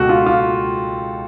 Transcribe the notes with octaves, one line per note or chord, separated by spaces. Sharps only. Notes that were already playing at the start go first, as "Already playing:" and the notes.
Already playing: C#2 B2 F#4 G4 A4
F4
F4